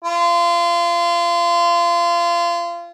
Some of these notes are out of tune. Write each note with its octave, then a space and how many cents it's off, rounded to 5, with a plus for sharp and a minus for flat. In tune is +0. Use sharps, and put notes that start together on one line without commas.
F4 -25